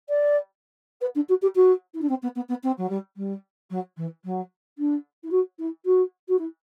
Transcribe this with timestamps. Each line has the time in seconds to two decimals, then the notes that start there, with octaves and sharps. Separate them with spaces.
0.09 D5
1.01 B4
1.15 D4
1.29 F#4
1.42 G4
1.55 F#4
1.94 E4
2.01 D4
2.09 C4
2.22 B3
2.35 B3
2.49 B3
2.63 C4
2.78 F#3
2.89 G3
3.17 G3
3.70 F#3
3.97 E3
4.24 F#3
4.78 D4
5.23 E4
5.31 F#4
5.59 E4
5.85 F#4
6.28 F#4
6.39 E4